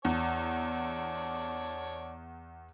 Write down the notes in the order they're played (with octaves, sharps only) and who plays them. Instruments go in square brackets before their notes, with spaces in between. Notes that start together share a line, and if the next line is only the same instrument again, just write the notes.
[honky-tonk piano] E2 [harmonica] C#5 D5 A5